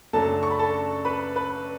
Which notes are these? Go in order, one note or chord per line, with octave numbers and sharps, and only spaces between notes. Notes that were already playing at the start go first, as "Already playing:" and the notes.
F#2 C#3 F#3 A3 D4 A4 A5
C#6
B5
A4 A5
B4 B5
B4 B5